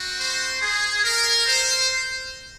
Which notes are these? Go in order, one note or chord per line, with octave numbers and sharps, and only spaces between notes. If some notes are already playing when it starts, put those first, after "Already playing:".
Already playing: C4 F#4
C5
G#4
A#4
C5